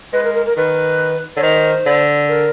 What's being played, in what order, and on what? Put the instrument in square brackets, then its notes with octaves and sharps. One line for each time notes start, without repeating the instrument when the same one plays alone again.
[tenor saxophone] G#3 [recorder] B4
[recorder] A#4
A#4
A#4
[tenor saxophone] D#3 [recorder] B4
[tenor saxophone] D3 [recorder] C#5
[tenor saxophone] D#3 [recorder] C5
[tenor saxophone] D3
[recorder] A#4